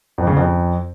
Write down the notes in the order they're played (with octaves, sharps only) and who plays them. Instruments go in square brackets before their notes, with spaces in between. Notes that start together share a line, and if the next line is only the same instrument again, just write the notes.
[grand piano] F2
C#3
F2